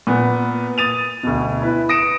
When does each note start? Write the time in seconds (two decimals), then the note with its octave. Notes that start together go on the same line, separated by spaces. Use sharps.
0.07 A#2 B3
0.78 D#6 A6 D#7 F7
1.23 D2 B2
1.62 E4 B4
1.89 D#6 A#6 C#7 D7 E7